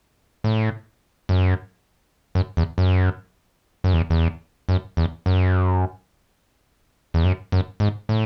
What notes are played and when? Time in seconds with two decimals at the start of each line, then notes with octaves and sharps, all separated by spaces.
0.44 A2
1.29 F#2
2.35 F#2
2.57 E2
2.78 F#2
3.84 F#2
3.93 E2
4.10 E2
4.69 F#2
4.97 E2
5.26 F#2
7.14 E2
7.24 F#2
7.52 F#2
7.80 G#2
8.09 A2